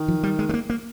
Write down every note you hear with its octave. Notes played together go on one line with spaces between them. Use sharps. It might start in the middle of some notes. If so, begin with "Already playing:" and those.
Already playing: D#3
F3
G3
G#3
G#3
A#3
A#3